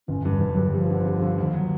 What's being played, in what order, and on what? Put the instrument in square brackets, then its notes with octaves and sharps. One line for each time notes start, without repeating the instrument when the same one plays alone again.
[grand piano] G1 [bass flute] C#4
[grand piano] G2 [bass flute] G3
[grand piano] G1
[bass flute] F#3
[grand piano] G2
[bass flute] F3 [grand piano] G3
[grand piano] D3
G3
D3
D#2
F#3